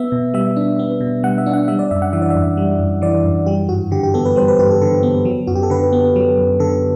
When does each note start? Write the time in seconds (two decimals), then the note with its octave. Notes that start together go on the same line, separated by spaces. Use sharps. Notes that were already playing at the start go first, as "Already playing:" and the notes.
Already playing: B3 E5
0.12 B2
0.34 G3 E5
0.56 D4
0.79 B3
1.00 B2
1.23 G3 F#5
1.38 E5
1.46 D4
1.53 F#5
1.68 G3 E5
1.79 D5
1.91 F#2 E5
2.02 F#5
2.13 E3 E5
2.22 D5
2.30 E5
2.35 F#2
2.57 G3
2.79 F#2
3.02 E3 D5
3.24 F#2
3.46 G3 G4
3.69 G2 F#4
3.91 D3 G4
4.03 G4
4.14 B3 A4
4.25 B4
4.36 G3 C5
4.48 B4
4.59 G2 G4
4.71 A4
4.82 D3 A4
5.03 B3
5.25 F#3
5.47 F#2 F#4
5.55 G4
5.63 A4
5.70 D3 B4
5.93 B3
6.16 F#3
6.37 F#2
6.60 D3 A4